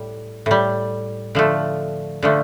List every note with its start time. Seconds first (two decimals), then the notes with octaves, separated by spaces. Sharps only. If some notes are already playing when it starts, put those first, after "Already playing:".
Already playing: A2 G3
0.46 A2 G3
1.35 D3 F3 A3
2.23 D3 F3 A3